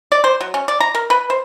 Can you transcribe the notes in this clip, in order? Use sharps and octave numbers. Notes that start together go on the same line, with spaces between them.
D5
C5
F#3
C#4
D5
A#5
A#4
B4
C5